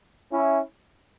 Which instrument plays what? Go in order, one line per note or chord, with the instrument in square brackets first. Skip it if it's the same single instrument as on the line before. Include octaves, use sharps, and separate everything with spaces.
[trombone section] C#4 E4